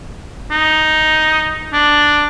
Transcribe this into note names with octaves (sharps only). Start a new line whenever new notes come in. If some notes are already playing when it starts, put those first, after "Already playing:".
D#4
D4